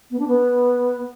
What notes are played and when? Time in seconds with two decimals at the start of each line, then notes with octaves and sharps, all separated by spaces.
0.11 B3
0.19 D4
0.28 B3